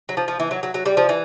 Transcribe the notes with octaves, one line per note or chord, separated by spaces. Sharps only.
F#3
F3
F3
E3
F#3
F#3
F#3
G3
F3
E3